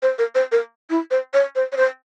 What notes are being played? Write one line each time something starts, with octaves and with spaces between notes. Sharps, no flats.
C5
A#4
C5
A#4
E4
C5
C#5
C5
C#5
C5